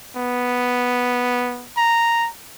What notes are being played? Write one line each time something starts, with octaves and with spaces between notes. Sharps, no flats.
B3
A#5